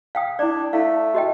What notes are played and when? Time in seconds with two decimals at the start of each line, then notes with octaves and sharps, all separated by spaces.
0.15 F5 G5 D#6
0.39 D4 E4 D5
0.73 A3 E4 F5
1.14 F#4 D#5 G5